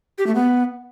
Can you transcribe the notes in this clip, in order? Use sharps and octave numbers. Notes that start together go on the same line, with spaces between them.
G4
A3
B3